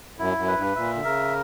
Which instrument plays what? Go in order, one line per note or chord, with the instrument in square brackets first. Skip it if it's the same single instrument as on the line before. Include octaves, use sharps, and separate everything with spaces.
[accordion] F#2 [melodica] E4
[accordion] F#2
[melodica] B4
[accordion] G2
[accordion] A#2 [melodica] E5
[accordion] D3
[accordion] C#3 [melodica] A#4